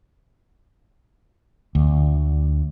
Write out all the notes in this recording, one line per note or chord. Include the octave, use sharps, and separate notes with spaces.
D2